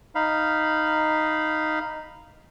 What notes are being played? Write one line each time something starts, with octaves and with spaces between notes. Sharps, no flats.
D#4 F5 B5